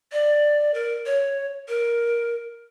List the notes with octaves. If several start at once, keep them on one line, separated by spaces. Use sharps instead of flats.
D5
A#4
C#5
A#4